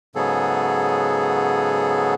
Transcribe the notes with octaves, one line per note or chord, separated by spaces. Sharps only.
G#2 C#3 F#3 B3 G#4 A4